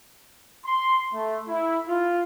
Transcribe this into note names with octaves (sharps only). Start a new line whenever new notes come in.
C6
A3
E4
F4